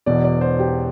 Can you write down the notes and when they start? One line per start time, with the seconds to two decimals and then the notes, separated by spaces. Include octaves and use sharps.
0.06 E1 E2 B2 D5
0.24 D5
0.41 C5
0.60 G4